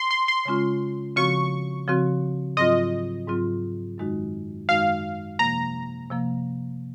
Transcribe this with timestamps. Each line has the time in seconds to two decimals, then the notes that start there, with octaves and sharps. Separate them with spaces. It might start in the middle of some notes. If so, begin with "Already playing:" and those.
Already playing: C6
0.11 C6
0.28 C6
0.45 C#3 G#3 C#4 F4
1.16 C#3 F3 C4 F#4 C#6
1.88 C#3 F3 C4 F#4
2.57 G#2 F#3 C4 F4 D#5
3.28 G#2 F#3 C4 F4
3.98 F#2 D#3 G#3 D#4 F#4
4.69 F#2 D#3 G#3 D#4 F#4 F5
5.39 C3 F3 A#3 A#5
6.10 C3 F3 A#3